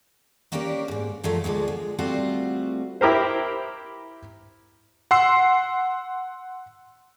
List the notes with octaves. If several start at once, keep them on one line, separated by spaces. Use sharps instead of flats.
A#3 C#4 D4 G4 G#4 A#4
E2 G#2
F#2 F3 F#3 A3
D2 D3 F3 G#3
G#3
G3 A3 C4 F4 F#4 C5
E4 G4 A#4 C5
F#5 C6 E6 C7